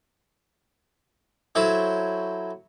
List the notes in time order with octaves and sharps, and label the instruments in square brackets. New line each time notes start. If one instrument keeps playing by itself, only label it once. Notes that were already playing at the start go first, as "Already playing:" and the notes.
[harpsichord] F#3 E4 A4 C5 C#5